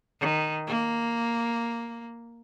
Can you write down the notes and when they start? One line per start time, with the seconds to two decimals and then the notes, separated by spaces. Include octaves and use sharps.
0.21 D#3
0.67 A#3